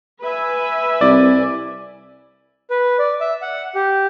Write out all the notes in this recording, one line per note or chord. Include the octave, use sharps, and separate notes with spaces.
B4 E5 G#5
C2 D5
B4
D5
E5
F#5
G4